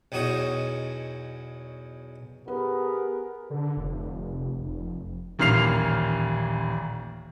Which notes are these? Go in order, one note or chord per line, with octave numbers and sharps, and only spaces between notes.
B1 E2 D#4 F#4 C#5 D#5
B3 G4 G#4 A#4 B4
D3
F1
F1
D#1 A1 A#2 F6 C7 F7